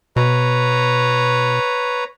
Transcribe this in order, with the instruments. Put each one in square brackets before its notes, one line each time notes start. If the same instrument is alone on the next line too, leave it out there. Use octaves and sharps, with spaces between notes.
[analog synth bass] B2 [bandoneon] B4 C#5 A#5